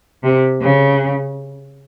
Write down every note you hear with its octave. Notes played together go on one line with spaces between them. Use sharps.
C3
C#3